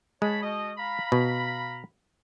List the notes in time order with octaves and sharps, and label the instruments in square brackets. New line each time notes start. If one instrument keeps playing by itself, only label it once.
[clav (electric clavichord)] G#3 [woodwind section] C#5 A5 B5
[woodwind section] B2 D#5
F5 A#5 B5
[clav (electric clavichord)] B2